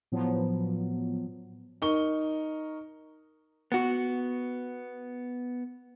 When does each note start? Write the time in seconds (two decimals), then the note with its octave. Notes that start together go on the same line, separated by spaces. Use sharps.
0.12 A2 F3 F#3 B3
1.82 D#4 A#4 C#6 G7
3.72 B3 F#4